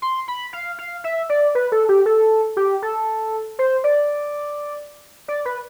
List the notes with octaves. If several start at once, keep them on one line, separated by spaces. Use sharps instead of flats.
C6
B5
F5
F5
E5
D5
B4
A4
G4
A4
G4
A4
C5
D5
D5
B4